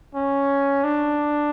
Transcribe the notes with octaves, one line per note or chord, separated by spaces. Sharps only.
C#4
D4